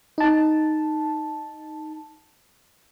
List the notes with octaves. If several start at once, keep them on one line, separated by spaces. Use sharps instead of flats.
D#4 A5